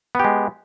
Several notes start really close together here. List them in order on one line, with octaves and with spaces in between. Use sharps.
B3 G4 G#3